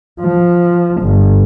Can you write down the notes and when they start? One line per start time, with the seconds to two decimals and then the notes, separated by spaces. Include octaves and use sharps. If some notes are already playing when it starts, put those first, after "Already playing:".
0.20 F3
1.02 G1